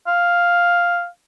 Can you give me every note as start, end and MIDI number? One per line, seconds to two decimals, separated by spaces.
0.08 1.07 77